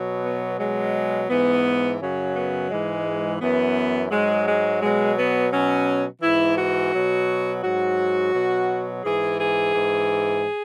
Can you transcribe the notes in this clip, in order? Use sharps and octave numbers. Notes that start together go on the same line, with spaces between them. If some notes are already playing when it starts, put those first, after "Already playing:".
Already playing: B2 F#3
B3
B2 F#3 G#3
G#2 E3 B3
F#2 C#3 F#3 C#4
B3
G#2 E3 G#3
F#2 E3 B3
G#2 F#3 G#3
G#3
B2 F#3 G#3
B3
B2 F#3 C#4
G#2 E3 E4
F#4
B2 F#3
G#2 F#3 F#4
B2 F#3
G#2 E3 G#4
G#4
G#2 E3